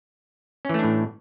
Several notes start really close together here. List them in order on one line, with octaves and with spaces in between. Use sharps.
C#4 E3 A3 D4 A2